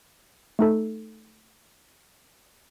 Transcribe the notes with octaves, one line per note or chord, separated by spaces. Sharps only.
A3 D#4 A4